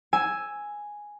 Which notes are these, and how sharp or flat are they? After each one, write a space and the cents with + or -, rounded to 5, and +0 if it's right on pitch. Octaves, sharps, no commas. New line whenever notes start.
G#5 +0 E6 +0